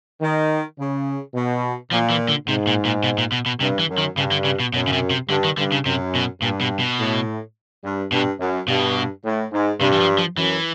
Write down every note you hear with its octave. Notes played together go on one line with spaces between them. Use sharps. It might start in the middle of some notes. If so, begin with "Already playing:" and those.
D#3
C#3
B2
A#2 F3
E3
D3
G#2 C3
A#2
A#2
B2
A#2
B2
B2
G2 C3
E3
F#2
D#3
G2 C#3
D3
C#3
B2
F#2 B2
C#3
C3
C3
G2 D3
D#3
G2 D3
C#3
F#2 C3
B2
G2 A#2
B2
B2
A2
G2
G2 B2
F#2
G2 B2
A2
G#2
G2 C3
E3
F3
F3
F#2 E3